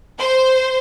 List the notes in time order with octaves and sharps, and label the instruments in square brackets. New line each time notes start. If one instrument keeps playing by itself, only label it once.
[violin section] C5